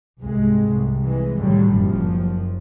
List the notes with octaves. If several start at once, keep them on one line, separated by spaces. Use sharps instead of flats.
C2 G#2 C3 G#3
C2
E3 G#3
A2 D3 D#3 F#3 G3
F#1 F#2 F3